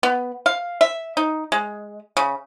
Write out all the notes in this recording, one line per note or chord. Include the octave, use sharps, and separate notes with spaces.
B3
F5
E5
D#4
G#3
C#3